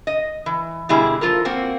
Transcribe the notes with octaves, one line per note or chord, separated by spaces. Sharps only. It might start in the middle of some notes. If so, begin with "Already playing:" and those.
D#5
E3
B2 D3 G3 E4 G#4
F3 F4 A4 A#4
A#3 C4 F#4